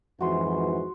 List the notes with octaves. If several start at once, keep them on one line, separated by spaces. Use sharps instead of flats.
F2 G#2 E3 F#4 C6